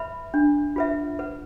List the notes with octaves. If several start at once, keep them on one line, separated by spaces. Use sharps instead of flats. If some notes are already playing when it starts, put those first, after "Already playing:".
Already playing: B4 E5 B5
D4
F4 B4 E5
B4